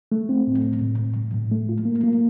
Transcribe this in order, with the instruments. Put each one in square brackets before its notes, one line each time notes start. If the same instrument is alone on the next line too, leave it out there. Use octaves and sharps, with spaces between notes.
[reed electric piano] A3
C4
A2
A2
A2
A2
A2
A2
A3
F4
A#3
A#3